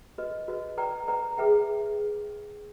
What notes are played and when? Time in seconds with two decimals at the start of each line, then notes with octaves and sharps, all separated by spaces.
0.18 F#4 B4 D#5
0.48 F#4 B4 D#5
0.78 B4 D5 G5 A#5
1.08 B4 D5 G5 A#5
1.38 G#4 B4 E5 G5